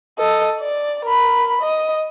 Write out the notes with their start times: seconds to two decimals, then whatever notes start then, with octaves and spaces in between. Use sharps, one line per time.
0.18 A4 D#5
0.60 D5
1.05 A#4 B5
1.61 D#5